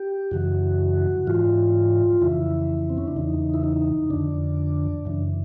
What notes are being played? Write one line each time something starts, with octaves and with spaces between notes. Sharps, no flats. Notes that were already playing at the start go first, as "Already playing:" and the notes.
Already playing: G4
F#2 C#3 E3 F#4
G#2 E3 F4
F2 C#3 E3 E4
C4
C#4
D4
E2 C#3 E3 D#4
E4
D#4
F2 D3 D4
F#2 C#3 E3